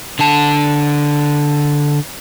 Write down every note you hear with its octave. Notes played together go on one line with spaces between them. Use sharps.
D3 A5